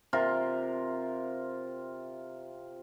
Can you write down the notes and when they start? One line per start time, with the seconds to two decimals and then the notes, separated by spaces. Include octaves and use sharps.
0.13 C3 F4 A#4